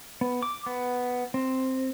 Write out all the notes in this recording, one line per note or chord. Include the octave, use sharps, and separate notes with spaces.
B3
D6
B3
C4